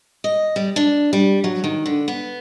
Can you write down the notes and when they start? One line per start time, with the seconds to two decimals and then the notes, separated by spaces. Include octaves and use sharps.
0.24 D#5
0.56 G3
0.76 D4
1.13 G3
1.44 F#3
1.64 D#3
1.86 D3
2.08 B3